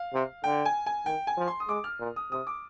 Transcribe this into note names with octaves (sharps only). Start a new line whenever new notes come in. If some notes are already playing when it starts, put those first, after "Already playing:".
Already playing: F5
C3
D3 G5
G#5
G#5
D#3 G5
G#5
F3
C6
D#6
G#3 D6
F6
A#2
D#6
C3 D#6
D6